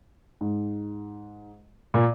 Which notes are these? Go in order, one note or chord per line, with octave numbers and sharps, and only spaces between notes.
G#2
A#2